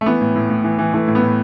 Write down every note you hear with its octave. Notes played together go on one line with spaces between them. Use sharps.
A3
E3 B3
A2
A2
A2
E3
E3
E3 A3
A2
B3
A2